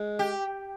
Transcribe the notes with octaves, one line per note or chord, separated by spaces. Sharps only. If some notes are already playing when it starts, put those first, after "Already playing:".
Already playing: G#3
G4